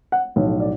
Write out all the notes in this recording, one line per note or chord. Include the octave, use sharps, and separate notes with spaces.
F#5
B1 A2 F3
D5